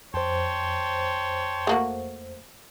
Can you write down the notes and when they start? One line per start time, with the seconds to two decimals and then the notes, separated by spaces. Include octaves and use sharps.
0.14 F2 C5 C#5 G5 A5 C6
1.67 A3 A#3 F#4